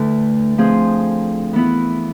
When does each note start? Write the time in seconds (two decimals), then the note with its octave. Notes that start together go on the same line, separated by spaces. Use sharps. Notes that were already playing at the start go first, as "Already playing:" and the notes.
Already playing: D2 D3 A3 E4 B4
0.58 F3 A3 C4 G#4 C5
1.53 E3 B3 E4